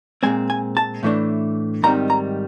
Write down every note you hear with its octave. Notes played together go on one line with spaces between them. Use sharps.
A#2 F3 G#3 C4 G#5
G#5
A5
A2 E3 A3 D4
G#2 D#3 G3 C4 A#5
A#5